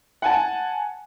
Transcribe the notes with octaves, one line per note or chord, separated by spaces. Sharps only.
F#5 G#5 A5